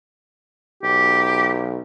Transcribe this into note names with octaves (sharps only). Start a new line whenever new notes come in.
B1 G4